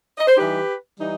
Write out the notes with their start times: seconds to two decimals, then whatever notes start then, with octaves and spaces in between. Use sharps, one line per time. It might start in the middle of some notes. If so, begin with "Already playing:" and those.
0.18 D#5
0.28 C5
0.37 E3 G3 D#4 G4 B4
0.98 E3 G3 D#4